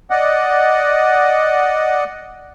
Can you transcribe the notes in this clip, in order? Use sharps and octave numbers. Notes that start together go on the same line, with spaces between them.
D5 D#5 F#5